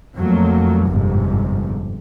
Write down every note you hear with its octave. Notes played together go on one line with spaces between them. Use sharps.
F2 F#3 A3 A#3
G1 F2 G#2 C3